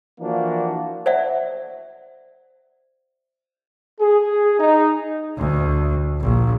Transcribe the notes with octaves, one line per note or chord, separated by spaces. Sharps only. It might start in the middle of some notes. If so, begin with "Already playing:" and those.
E3 F3 A#3 D4 F#4
C5 D5 E5 F#5
G#4
D#4
D2
A#1